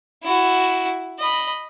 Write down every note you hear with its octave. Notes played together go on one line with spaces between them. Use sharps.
E4 F#4
D#5 B5